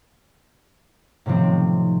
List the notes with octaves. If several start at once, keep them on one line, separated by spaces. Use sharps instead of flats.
A2 C3 D#3 F3 C4